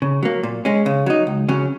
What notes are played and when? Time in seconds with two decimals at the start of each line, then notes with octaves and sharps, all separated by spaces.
0.02 C#3
0.23 F#3 A#3
0.43 A#2
0.65 G#3 C#4
0.86 C#3
1.06 F#3 D#4
1.27 C#2
1.49 C#3 F#3 C#4